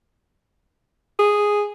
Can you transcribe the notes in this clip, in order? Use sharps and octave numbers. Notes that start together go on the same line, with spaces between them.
G#4